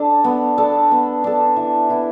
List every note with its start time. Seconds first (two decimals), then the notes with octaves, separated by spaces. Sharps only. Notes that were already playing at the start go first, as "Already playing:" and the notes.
Already playing: D4 A4
0.24 B3
0.58 D4 A4
0.91 B3
1.24 D4 A4
1.56 E3
1.90 B3 E4